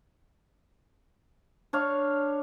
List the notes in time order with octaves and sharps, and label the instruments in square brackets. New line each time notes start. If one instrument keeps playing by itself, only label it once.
[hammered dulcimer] D4 C#5 F5